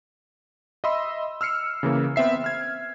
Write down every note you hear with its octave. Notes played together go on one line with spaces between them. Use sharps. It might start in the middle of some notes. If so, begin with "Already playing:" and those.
D#5 E5 B5 C6 E6
E6 F6 C7 C#7
C#3 E3 A#3
B3 C4 E5 C7
F6 G#6